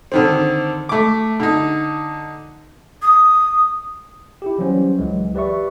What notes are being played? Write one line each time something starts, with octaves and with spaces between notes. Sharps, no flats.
D3 D#3 C4
A3 D6
D3 D#4
D#6
E4 G4
E3 F#3 G3 C#4 C5
C#2 E3 F#3 G#3
G4 B4 D5 E5 C#6